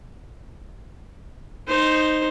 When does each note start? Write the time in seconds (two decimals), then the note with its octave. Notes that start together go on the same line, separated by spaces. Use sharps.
1.67 D#4 C5